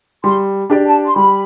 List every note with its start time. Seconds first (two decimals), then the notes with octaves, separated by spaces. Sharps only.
0.24 G3 C6
0.70 D4 G4 D5
0.85 A5
1.05 C6
1.15 G3 B5